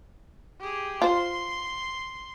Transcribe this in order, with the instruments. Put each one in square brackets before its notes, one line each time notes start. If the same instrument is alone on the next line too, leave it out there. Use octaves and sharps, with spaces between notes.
[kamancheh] G4 G#4
[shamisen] F4 C5 [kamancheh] C6